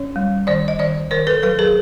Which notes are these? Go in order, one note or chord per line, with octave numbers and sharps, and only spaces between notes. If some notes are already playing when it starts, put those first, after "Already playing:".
Already playing: C#4 C#5
G3
D#3 C5 D5
D#5
D#3 C5 D5
D#3 A#4 C5
A4 B4
F#3 A4 B4
G#4 A#4